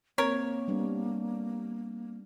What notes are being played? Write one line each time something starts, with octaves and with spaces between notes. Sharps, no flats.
A#3 C4 A#4 C#5
G3 B3 D4